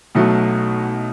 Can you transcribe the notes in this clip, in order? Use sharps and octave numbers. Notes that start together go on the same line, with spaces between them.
B1 B2 F#3 A3